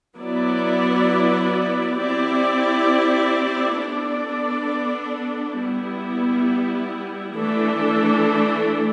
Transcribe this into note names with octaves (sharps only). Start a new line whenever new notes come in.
F#3 B3 E4 B4 D5
C4 E4 G4 D5
B3 D4 A4 D5
G3 B3 E4
E3 A3 D4 A4